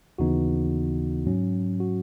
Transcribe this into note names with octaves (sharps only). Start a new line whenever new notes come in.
D#2 C#3 E3 B3 D#4 F#4
G#2 F#3 C#4
F#4